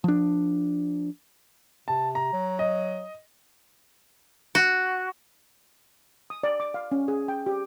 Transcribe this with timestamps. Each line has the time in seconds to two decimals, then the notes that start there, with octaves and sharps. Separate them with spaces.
0.04 F3 D4
1.88 C3 A5
2.15 A#5
2.33 F#3
2.59 D#5
4.55 F#4
6.30 D#6
6.43 D5
6.60 D6
6.74 F5
6.92 C#4
7.08 G#4
7.28 G5
7.47 G4